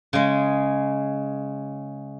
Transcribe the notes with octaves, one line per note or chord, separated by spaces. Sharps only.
C#3 G#3